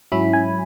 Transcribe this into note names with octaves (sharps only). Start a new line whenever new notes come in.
G#2 F#3 C#4 E4 B5
G#5